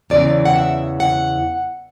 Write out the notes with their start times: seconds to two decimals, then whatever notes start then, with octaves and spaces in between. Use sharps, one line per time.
0.10 E2 C#3 E3 D5
0.45 F#5
0.56 E5
1.00 F#5